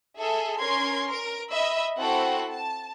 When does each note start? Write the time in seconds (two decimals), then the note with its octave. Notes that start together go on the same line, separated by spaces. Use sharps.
0.18 G#4 A4 E5
0.59 C#4 A#4 C6 G#6
1.07 A#4 D7
1.51 D#5 E5 B5 E6
2.00 C4 E4 F#4 A4 F#5
2.51 A5